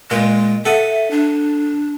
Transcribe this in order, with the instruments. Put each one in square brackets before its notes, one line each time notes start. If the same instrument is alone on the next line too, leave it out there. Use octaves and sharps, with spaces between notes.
[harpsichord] A#2 [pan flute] G#3
[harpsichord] A4 F#5 D#6 [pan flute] E5
[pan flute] D4